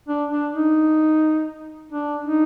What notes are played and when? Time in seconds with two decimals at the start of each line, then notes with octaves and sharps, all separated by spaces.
0.08 D4
0.31 D4
0.54 D#4
1.92 D4
2.26 D#4